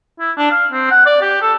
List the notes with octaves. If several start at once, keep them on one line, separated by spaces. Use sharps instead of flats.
E4
D4
F5
C4
F#5
D5
G4
A4